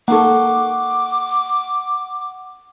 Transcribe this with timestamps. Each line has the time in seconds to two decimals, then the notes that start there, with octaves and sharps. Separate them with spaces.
0.08 A#3 D#4 A4 F#5 C#6 D6